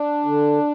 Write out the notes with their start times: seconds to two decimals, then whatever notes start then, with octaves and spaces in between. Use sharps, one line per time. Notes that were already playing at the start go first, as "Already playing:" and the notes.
Already playing: D4
0.25 D3